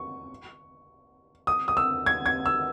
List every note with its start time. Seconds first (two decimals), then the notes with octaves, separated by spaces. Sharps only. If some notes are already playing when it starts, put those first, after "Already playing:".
Already playing: C#6
1.47 D#6
1.68 D#6
1.77 E6
2.06 G#6
2.26 G#6
2.46 E6